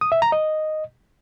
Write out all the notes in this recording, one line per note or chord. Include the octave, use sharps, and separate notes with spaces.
D#6
E5
A#5
D#5